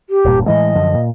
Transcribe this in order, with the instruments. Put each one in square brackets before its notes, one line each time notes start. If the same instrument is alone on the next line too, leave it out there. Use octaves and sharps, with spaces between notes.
[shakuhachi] G4
[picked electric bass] E1 G2 A#2
[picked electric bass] A2 E3 G#3 [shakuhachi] D#5
[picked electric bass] F#2 D3 F3
A#2